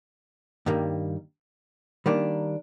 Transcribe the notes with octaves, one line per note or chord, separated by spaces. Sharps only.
G2 D#3 G3 A#3
D#3 G3 A#3 D4